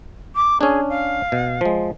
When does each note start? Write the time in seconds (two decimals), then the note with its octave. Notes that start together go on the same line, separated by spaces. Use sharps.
0.35 D6
0.61 C#4 D4 G#4
0.89 F5
1.32 B2
1.61 F3 G#3